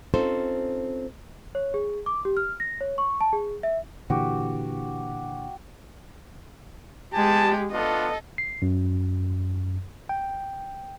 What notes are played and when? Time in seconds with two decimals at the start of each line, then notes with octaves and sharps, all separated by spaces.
0.14 C4 C#4 D#4 F4 A4 C5
1.55 C#5
1.74 G#4
2.06 D6
2.25 G4
2.37 F6
2.60 A#6
2.81 C#5
2.98 C#6
3.21 A5
3.33 G#4
3.63 E5
4.10 A#2 D3 E3 F#4 G4
7.14 G#3 B3 G4 G#5 A5
7.72 B3 D4 F4 A4 D#5
8.38 C7
8.62 F#2
10.09 G5